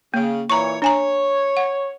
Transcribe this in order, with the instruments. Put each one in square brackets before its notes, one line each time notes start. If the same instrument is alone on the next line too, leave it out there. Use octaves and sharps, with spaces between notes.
[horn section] C#3 [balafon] A#3
[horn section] A#2 E3 C#5 [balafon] A#5 C#6
[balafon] D4 G#5 A#5 [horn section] C#5
[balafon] F#5